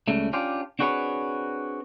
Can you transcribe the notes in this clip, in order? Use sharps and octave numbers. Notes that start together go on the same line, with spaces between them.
C#2 C#3 G3 A3
C#4 D4 F4 G4
C4 D4 F#4 G#4 B4 C#5